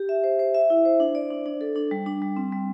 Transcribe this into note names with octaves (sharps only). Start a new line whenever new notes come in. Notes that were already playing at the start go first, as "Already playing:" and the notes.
Already playing: G4
E5
C5
C5
E5
E4
C5
D4
D5
D4
D4
A4
D4
G3
D4
G3
C4
G3